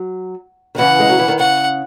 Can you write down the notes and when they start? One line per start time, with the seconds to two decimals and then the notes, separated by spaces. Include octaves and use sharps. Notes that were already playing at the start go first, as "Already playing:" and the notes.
Already playing: F#3
0.75 D#3
0.78 C#3 E3 F#5
1.00 G#3
1.09 F#3
1.19 E3
1.28 D#3
1.39 C#3 F#5